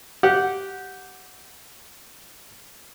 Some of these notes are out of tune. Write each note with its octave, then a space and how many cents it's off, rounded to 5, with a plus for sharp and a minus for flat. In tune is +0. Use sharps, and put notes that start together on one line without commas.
G4 -10 F#5 -5